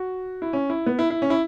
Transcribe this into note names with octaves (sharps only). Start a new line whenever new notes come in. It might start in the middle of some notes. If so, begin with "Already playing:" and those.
Already playing: F#4
E4
C#4
E4
B3
E4
E4
C#4
E4